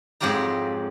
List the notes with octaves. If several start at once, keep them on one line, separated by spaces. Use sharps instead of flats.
F2 G#2 F#3 F4 G4 A#5